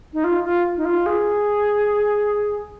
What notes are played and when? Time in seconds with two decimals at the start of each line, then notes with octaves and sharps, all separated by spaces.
0.13 D#4
0.24 F4
0.44 F4
0.77 D#4
0.85 F4
1.06 G#4